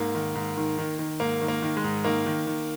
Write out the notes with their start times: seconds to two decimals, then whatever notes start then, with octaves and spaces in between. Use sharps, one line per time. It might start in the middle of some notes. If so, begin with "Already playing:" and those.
Already playing: G#2 A#3
0.15 D#3
0.35 G#2
0.57 D#3
0.78 D#3
0.99 D#3
1.20 G#2 A#3
1.41 D#3
1.48 A#3
1.63 D#3
1.77 G#3
1.84 G#2
2.04 D#3 A#3
2.26 D#3
2.47 D#3